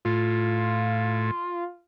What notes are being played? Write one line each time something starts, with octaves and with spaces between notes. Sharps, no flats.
A2 F4